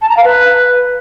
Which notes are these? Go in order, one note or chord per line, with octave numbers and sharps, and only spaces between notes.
A5
A#5
F5
B4